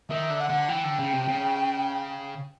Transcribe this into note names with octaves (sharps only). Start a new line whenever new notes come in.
D#3 E5
D3
F#5
D3
E3 G5
D3
C#3
C3
C#3